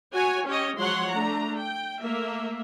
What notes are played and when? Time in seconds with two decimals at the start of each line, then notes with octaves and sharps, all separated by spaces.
0.13 F#4 C#5 G#5
0.46 C#4 G4 C#5 D#5
0.78 F3 F#3 G#3 C#5 F#5 C6
1.12 A3 D4 A#5
1.58 G5
2.01 A3 A#3 E5